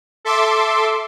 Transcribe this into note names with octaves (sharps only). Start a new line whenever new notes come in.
A4 E5 C6 D6